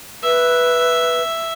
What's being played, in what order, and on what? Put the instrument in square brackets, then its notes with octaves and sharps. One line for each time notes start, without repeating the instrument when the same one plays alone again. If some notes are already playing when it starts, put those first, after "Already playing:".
[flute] B4 [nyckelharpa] E5